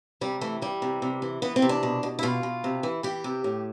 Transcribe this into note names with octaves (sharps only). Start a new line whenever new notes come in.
C3 G3
E3 A3
E3 G3
C3
C3
E3
E3 B3
C4
C3
D4
B2
B2
E4
B2 F4
B2
C3
E3
E3 G4
C3
A2